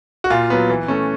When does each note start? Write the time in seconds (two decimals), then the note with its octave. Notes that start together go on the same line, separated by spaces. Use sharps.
0.24 F#4
0.30 A#2 F4
0.50 F#3 B3
0.70 E3
0.88 A3 C#4